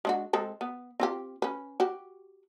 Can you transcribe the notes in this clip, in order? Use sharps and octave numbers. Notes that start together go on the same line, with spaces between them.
G#3 D4 F#4
G#3 C4 A4
B3
C4 F4 G4
C#4 B4
F#4 G4